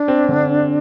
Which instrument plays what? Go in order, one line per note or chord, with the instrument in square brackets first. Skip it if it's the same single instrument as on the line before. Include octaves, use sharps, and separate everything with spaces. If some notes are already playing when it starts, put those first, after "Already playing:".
Already playing: [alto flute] D4
[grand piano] C4
D3